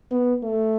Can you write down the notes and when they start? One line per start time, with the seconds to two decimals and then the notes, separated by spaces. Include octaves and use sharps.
0.11 B3
0.43 A3